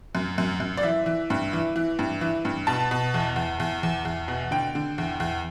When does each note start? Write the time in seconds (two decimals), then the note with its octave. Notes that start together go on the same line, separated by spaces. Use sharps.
0.15 F#2
0.38 F#2
0.60 F#2
0.77 D5
0.83 E3 E5
1.06 E3
1.30 G2
1.53 E3
1.76 E3
1.99 G2
2.21 E3
2.45 G2
2.67 B2 A5
2.91 B2
3.14 E2
3.36 E2
3.60 E2
3.83 E2
4.05 E2
4.28 B2
4.51 D3 G5
4.75 D3
4.98 E2
5.20 E2